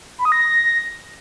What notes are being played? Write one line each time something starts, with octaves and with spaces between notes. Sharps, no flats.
B5
D#6
A#6